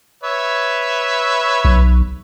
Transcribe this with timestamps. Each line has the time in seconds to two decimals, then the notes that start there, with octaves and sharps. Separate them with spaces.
0.23 B4 C#5 E5
1.65 B1